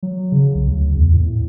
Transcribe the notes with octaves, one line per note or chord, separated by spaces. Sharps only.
F#3
C#3
C2
D2
E2
A2